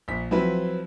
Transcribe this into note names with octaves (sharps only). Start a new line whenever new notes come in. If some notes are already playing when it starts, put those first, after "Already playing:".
A#1 B6
F3 F#3 C4 E4 B4